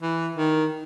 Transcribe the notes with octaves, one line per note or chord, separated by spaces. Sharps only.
E3
D#3